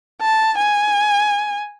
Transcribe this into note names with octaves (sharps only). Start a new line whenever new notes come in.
A5
G#5